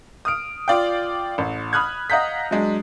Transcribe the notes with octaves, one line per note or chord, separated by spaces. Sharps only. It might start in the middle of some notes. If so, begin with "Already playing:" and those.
D#6 F6 D7
F4 D5 F5 G5
A1
B5 D#6 F6 F#6 G#6
D#5 F5 F#5 A#5 G6 B6
F#3 G#3 D4